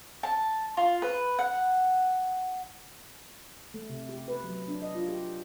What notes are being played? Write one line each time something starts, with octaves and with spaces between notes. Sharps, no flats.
A5
F4
B4
F#5
A3
C3
G4
B4
F#3
D4
D#5
F4
G4